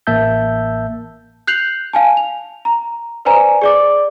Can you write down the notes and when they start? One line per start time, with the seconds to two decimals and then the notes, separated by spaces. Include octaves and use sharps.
0.07 A1 A#3 E5 A5 E6 G6
1.47 F#6 G6 C7 F7 F#7
1.93 F5 G#5 A5
2.17 F7
2.65 A#5
3.25 B4 C5 D5 G#5 A#5
3.62 G#4 D5 D6